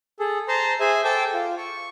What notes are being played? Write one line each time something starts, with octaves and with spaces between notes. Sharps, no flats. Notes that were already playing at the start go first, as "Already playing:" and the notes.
G#4 A4
C5 A5 A#5 C6
G#4 C5 E5 G#5
A4 C5 G5 A5 D6 E6
F4
C#6